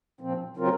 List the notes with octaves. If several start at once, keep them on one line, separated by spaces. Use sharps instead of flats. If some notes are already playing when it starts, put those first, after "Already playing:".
A#2 F3 C4
C#3 F#3 C4 F4 A#4